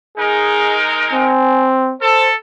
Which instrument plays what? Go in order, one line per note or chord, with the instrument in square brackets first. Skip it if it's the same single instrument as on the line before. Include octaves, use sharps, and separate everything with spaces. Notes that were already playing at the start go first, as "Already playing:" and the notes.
[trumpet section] G#3 D#4 A#4 [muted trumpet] G#4
[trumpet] C4 [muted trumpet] G#5
[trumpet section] A4 [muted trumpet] C5